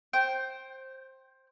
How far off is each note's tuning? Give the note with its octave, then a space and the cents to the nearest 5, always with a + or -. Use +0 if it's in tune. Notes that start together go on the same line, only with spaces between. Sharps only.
C5 +15 G5 -10